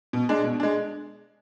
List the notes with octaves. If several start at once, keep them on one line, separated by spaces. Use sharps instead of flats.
B2
G#3 D4
B2
G#3 D4